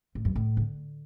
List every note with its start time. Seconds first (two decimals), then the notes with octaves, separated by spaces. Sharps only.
0.15 A2
0.25 F#2
0.36 A2
0.57 D3